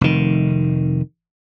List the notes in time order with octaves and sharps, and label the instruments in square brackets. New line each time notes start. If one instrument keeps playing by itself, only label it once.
[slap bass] F1 D#3